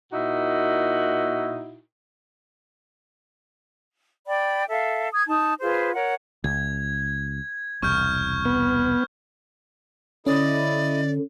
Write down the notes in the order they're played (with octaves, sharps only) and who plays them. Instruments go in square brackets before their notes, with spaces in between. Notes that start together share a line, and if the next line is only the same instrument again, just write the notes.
[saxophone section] A#2 D#4 E4 F#4
[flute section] D5 G5 B5
A4 E5 F5
D#6 G#6
D#4 A5
F4 G#4 B4 C5
A#4 C#5 F#5
[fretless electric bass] C#2 [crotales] G#6
[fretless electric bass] E1 C2 [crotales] C#6 F6 G6
[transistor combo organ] B3
[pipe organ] D3 [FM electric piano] C#4 [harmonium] E4 D#5 [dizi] D5